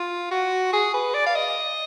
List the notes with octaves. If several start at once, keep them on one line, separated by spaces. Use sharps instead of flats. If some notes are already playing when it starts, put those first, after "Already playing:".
Already playing: F4
F#4
G#4
B4
D5
F5
D#5